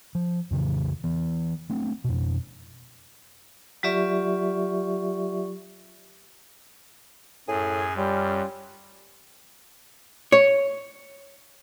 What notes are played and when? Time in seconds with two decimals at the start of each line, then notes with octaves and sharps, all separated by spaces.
0.15 F3
0.51 F2 C#3 E3
1.04 E3 B3
1.70 A3 B3 C4 D4
2.04 F2 B2
3.83 F#3 F4 G4 D5 E5 C#6
7.48 F#2 A2 G#4 G#5
7.97 G3 C#4 F4
10.32 C#5